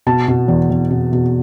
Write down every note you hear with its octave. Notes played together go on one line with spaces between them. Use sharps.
B2 A5
B2
E2
E2
B2
B2